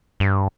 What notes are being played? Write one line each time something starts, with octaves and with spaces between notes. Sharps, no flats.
G2